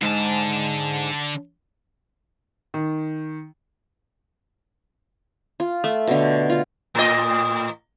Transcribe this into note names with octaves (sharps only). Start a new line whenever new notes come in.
G#2 D3 A5
D#3
F4
A3
B2 D3
F4
A2 D#5